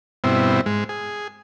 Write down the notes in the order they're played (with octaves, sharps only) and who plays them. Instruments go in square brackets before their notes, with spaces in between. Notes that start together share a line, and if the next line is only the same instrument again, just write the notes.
[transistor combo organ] G2 B2 C4 E4
G#2 G#3
G#4